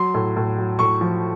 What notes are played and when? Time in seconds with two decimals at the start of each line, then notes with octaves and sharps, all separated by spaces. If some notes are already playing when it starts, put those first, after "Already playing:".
Already playing: F#3 C6
0.14 A2
0.36 A2
0.58 F#3
0.79 A2 C#6
1.01 F3